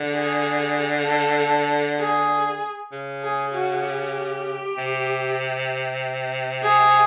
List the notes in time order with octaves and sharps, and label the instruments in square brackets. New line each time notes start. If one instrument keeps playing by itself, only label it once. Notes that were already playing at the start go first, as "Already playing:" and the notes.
Already playing: [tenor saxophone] D3
[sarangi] G#4
A4
G#4
[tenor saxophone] C#3
[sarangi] G#4
F#4
G4
[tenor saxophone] C3
[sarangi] G#4